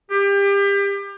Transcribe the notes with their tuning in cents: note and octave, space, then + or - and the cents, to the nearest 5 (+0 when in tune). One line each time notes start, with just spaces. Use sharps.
G4 +30